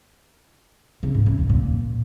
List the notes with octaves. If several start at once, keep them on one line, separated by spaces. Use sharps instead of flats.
C#3
G#2
C#3
E2
A#2